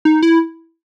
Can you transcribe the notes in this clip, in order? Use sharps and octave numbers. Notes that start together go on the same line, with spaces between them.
D#4
E4